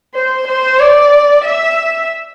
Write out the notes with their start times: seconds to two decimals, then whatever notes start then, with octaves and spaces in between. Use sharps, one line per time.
0.15 C5
0.47 C5
0.80 D5
1.45 E5